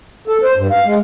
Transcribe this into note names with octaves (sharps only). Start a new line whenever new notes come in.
A4
C5
G2
F5
G#3